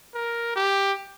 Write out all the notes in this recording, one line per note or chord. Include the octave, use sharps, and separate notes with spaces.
A#4
G4